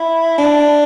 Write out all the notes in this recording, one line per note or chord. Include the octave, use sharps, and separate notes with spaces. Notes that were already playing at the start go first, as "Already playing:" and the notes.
Already playing: E4
D4